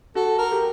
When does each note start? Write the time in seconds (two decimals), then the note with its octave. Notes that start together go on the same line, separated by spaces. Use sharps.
0.15 F#4 A4
0.39 A#4
0.52 G4